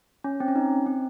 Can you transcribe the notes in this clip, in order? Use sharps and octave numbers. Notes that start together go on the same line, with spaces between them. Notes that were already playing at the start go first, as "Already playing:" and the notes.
C#4
C4
C#4
D#4
C4